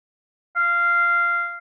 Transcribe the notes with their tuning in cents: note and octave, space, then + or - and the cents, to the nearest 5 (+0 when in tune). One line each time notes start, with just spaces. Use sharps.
F5 -15